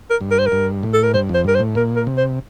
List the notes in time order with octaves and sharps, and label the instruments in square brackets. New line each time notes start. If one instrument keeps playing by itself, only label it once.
[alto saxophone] A#4
[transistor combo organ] G2
[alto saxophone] A#4
C5
A#4
[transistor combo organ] G2
A2
[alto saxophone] A4
A#4
[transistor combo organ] G2 [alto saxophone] C5
[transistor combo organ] F2 [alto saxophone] C5
[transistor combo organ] G2 [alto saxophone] A#4
[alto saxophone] C5
[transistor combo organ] A2
[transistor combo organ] A#2 [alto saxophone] A#4
[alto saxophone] A#4
[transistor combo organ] C3
[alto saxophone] C5